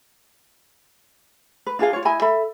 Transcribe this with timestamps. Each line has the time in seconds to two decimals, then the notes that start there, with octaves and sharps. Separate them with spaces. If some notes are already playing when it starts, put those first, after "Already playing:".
1.66 B4
1.79 D4 F4 G#4 F5
1.93 F4 C#5
2.05 E4 D#5 G#5 B5
2.22 A4 E5 B5